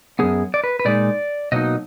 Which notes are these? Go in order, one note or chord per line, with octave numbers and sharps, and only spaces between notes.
F#2 F3 B3 G#4
D5
B4
B4
A#2 G#3 D#4 D5
B2 F#3 A#3 D#4 D#5